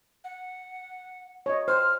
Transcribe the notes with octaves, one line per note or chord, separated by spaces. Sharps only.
F#5
C#5 D#5
C5 F6